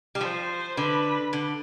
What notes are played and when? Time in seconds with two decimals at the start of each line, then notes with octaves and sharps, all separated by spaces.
0.15 G3
0.21 F3 C5
0.77 D3 B4
1.33 D3